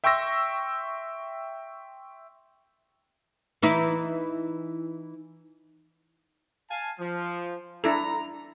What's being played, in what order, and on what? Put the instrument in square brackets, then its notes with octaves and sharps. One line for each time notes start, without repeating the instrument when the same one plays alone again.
[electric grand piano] E5 G5 C6 C#6 E6 A#6
[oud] E3 D#4 E4
[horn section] F5 G#5 A5
F3
[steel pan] D4 E4 A4 [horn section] A#5